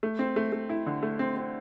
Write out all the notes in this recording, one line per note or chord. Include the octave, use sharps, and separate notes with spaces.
A3
C4
A3
A3
E4
D3
A3
C4
C4